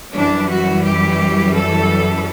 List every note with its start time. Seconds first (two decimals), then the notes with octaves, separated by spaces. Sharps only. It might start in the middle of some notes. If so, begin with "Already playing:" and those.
0.15 F#2 E3 G3 D4
0.50 F#4
0.84 G4
1.54 A4